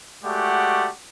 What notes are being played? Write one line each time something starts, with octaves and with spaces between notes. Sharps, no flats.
G#3 A3 F#4 G4 D5 F#5